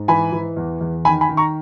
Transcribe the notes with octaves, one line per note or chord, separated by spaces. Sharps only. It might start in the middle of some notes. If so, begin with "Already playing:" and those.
Already playing: G#2
E3 G#5 B5
E3
E2
E2
D#3 G#5 B5
G#5 B5
D#3
A#5 C#6